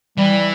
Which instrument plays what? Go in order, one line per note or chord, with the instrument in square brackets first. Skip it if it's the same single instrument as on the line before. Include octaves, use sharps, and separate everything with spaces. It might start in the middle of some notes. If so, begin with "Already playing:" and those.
[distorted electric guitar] E3 [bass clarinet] G3